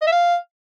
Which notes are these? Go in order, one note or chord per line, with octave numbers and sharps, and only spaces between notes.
D#5
E5
F5